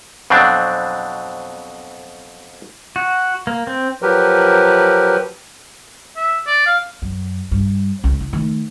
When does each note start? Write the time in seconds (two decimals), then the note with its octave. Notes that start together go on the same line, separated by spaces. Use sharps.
0.30 F2 B2 F#3 C4 D4
2.96 F#4
3.47 A#3
3.67 C4
4.02 F3 F#3 G4 A#4 B4
6.16 E5
6.47 D5
6.67 F5
7.02 F#2
7.51 G2
8.04 C#2 C#4
8.21 E4
8.33 D#3 A3